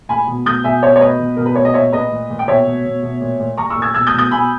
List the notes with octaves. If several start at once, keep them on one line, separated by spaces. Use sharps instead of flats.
A#2 G#5 B5
B2
B2 D#6 G6
B2 E5 G#5
B2 C#5 E5
C#5
B2 B4 D#5
B2
B2 A#4
B4
B2 C#5
D#5
A#2 C#5 E5
A#2 B4 D#5
A#2
A#2
G5
B2 C#5 E5
B2
B2
B2
A#2
A#2
A#2 A#5 C#6
C#6 E6
A#2
E6 G#6
B2 E6 G#6
D#6 G6
B2
D#6 G6
B2 G#5 B5